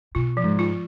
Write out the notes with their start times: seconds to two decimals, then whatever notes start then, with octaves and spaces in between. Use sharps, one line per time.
0.15 B2 F4
0.37 F3
0.44 G#2
0.59 F4